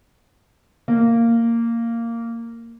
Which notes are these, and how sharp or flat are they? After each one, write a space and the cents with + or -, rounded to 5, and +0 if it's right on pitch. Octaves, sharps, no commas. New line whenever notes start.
A#3 -10